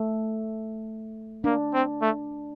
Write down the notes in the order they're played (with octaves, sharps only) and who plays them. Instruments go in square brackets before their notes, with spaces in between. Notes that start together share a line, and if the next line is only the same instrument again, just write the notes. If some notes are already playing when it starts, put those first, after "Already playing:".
Already playing: [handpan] A3
[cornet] A#3 [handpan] D4
[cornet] C4
A3